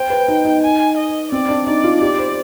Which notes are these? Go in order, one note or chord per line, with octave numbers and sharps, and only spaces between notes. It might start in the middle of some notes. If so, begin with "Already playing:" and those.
Already playing: C5 G5
B4
D#4
D#4
G#5
D#5
C4 D5
D4
D#4 D5
F4
G4 D5
C5